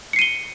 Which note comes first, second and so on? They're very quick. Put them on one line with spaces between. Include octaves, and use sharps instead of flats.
C#7 C7 D#7 G7